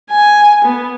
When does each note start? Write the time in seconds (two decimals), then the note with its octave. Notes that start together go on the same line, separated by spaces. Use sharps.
0.11 G#5
0.65 B3